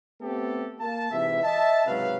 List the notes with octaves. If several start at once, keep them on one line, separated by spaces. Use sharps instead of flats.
A3 B3 C4 G4 A4
A#3 A5
G#2 C3 E3 E5
D#5 E5 A5
C#2 G#2 C3 F#3 B4 F5